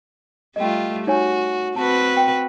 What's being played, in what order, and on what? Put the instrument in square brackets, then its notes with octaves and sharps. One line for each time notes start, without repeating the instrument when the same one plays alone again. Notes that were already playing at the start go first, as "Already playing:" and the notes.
[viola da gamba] G3 A3 F4 [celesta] D#5 G5
[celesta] D#4 C#5 G#5 [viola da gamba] F#4
[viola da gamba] C4 F#4 B4 [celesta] A5
[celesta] G5